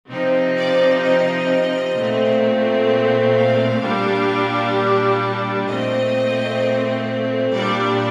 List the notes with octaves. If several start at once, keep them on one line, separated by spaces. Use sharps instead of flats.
C3 F3 C4 D#4
D5
D#5
A#2 A3 C4
F5
A#2 G3 D4
A#2 A3 C4 D#5
A#2 G3 D4 D5